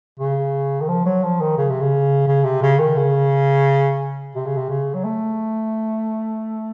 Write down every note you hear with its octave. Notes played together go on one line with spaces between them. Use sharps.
C#3
D#3
F3
F#3
F3
D#3
C#3
C3
C#3
C#3
C3
C#3
D#3
C#3
C3
C#3
C3
C#3
F#3
A3